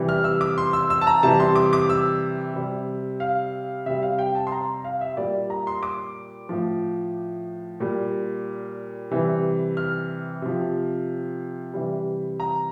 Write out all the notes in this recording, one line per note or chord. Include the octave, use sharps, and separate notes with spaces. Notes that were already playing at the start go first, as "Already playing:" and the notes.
Already playing: C3 E3 G3
F6
E6
D6
C6
E6
E6
A5
A#5
C3 E3 G3 A5
C6
D6
D6
E6
C3 G3
F5
C3 G3 E5
F5
G5
A5
C6
A#5
F5
E5
A#2 G3 D5
A#5
C6
D6
A2 F3
A#2 G3
C3 E3 G3
F6
C3 F3
C3 E3 G3
A#5